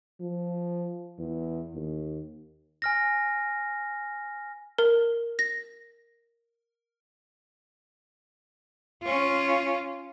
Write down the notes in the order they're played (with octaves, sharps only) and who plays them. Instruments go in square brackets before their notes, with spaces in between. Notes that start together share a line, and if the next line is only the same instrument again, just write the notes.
[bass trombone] F3
E2
D#2
[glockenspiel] G#5 F6 A#6
[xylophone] A#4
A#6
[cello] C#4 F4